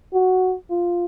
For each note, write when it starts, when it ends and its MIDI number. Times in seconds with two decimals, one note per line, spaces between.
0.13 0.54 66
0.70 1.05 65